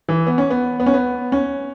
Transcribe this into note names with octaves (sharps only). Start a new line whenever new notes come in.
E3
B3
C#4
B3
B3
C#4
B3
C#4